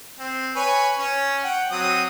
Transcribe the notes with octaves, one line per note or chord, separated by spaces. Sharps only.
C4
B4 C#5 G#5
C#4
F#5 G5
F#3 C4 D#6